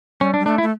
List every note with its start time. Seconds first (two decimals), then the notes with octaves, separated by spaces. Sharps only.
0.21 G3 C#4
0.34 D4
0.39 G3
0.46 A3 D4
0.58 E4
0.62 A3